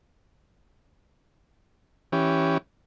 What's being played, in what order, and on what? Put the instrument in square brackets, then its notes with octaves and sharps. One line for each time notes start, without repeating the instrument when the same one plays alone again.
[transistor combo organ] E3 C#4 G4